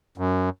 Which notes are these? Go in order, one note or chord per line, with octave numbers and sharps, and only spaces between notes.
F#2